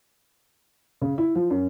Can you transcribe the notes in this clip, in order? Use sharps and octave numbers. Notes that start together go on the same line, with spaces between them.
C#3
E4
F3
F#2